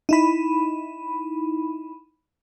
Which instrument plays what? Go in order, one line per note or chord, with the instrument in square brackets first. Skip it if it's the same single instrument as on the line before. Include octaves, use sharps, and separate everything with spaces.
[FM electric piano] D#4 E4 B5